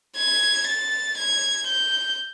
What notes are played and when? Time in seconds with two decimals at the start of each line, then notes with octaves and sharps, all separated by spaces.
0.17 G#6
0.67 A6
1.17 G#6
1.67 G6